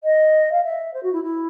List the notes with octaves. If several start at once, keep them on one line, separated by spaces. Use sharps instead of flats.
D#5
F5
E5
C5
F#4
E4
E4